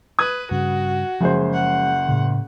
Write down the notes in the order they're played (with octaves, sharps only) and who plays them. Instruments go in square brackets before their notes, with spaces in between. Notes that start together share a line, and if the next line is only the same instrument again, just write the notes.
[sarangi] B4 [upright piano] D#6 G#6
[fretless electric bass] G2 C#3 [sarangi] F#4
[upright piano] F#1 G#4 C5 [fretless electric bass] F3 G#3 C#4
[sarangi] F#5
[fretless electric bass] A2 C#3